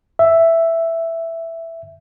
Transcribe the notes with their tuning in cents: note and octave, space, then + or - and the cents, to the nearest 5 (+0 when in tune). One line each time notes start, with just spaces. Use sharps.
E5 +5